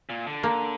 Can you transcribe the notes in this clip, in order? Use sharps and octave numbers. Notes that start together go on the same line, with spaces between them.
A#2
D3
A#3